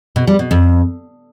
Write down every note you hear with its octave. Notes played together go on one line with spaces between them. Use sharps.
B2
G3
B2
F2